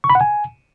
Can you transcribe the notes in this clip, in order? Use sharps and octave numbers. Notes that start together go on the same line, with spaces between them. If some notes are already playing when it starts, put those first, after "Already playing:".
C#6
B5
F#5
G#5